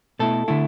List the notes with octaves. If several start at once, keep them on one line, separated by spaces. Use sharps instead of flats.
B2 A3 E4 A4
D3 A3 E4